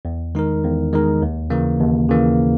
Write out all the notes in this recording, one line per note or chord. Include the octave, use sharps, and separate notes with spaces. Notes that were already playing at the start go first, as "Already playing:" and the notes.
E2
D#3 G#3 D#4 A#4
E2
D#3 G#3 D#4 A#4
D#2
C#3 E3 A#3
D#2
C#3 E3 A#3